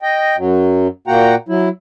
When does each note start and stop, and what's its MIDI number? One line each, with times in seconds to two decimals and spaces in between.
0.02 0.36 75
0.02 0.36 79
0.37 0.88 42
0.37 0.88 54
1.08 1.35 46
1.08 1.35 58
1.08 1.35 66
1.08 1.35 78
1.08 1.35 79
1.08 1.35 82
1.49 1.69 54
1.49 1.69 64